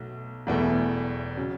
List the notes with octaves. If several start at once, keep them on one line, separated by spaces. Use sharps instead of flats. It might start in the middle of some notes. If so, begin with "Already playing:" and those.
Already playing: B1 B2 A3
E1 E2 E3 A3
C#3 F#3